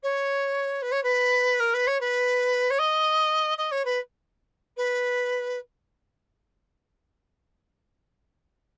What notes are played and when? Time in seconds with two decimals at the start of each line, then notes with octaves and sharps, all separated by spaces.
0.03 C#5
0.82 B4
0.91 C#5
1.03 B4
1.60 A#4
1.74 B4
1.87 C#5
2.00 B4
2.70 C#5
2.79 D#5
3.58 D#5
3.71 C#5
3.85 B4
4.77 B4